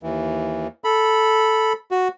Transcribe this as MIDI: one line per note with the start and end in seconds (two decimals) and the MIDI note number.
0.03 0.67 39
0.03 0.67 52
0.84 1.73 69
0.84 1.73 83
1.91 2.08 66